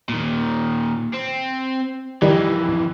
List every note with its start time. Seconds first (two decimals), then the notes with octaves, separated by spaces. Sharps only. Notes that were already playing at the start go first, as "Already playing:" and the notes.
0.09 A#2 D#3
1.14 C4
2.22 F2 D#3 E3 G3